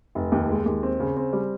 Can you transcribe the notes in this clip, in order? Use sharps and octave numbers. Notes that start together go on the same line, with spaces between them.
F1
D#2
G#3
D#2
C4
C#3
C4
G3